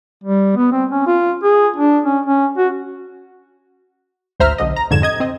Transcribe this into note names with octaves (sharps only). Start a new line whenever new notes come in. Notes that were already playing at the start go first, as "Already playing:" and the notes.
G3
B3
C4
C#4
F4
G#4
D4
C#4
C#4
F#4
G#1 D2 C5 E5 A#5 F6
B1 D3 D#5
A#5
F2 G#2 D3 G#6 E7
C3 D#5 G#6
C4 D#5